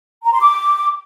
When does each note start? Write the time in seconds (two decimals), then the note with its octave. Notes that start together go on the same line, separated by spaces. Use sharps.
0.24 A#5
0.33 C6
0.41 D6